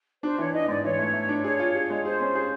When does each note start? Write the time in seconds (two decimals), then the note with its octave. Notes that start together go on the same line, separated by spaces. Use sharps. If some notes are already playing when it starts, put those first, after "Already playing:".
0.23 D4 C5
0.38 E3 C#5
0.53 D4 D#5
0.68 G#2 D5
0.84 E3 C#5
0.99 A3
1.13 A3
1.29 D4
1.44 G#4 C#5
1.59 F4
1.75 G#4
1.90 G#3
2.05 G#4 C5
2.20 C#4
2.35 G#4